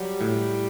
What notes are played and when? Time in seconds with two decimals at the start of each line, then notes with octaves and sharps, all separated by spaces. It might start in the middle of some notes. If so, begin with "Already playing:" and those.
Already playing: F#3 G3
0.21 A2